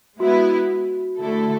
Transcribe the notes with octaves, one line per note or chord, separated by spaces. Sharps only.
G#3 B3 E4 F#4 B4
D3 A3 E4 A4